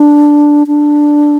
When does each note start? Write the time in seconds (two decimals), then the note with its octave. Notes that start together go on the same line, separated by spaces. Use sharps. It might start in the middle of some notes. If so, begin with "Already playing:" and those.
Already playing: D4
0.67 D4